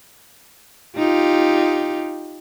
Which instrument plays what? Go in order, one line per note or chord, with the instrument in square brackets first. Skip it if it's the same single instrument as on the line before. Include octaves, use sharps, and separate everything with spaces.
[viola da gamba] D#4 F4 G4